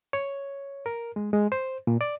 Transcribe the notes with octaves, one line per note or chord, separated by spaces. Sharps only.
C#5
A#4
G#3
G#3
C5
A#2
D5